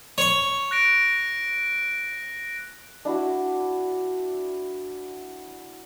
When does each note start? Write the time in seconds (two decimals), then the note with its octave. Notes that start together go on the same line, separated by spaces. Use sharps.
0.18 C#5 C#6
0.71 F#6 A#6 D7
3.05 D4 E4 F#4